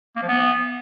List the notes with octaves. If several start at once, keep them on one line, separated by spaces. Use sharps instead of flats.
A#3
F3
B3